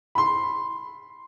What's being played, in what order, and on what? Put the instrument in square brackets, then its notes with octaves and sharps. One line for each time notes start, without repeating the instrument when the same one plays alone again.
[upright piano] B5 C6